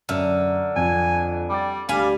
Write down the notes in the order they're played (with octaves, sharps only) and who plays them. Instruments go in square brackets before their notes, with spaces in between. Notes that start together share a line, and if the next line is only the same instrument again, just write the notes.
[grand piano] F#2 E5 F6 [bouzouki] D3
[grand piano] F2 F3 [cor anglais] G#5
[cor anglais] G3 [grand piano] G5 D6 A6
[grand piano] D2 [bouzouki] G3 G#5 [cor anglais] F5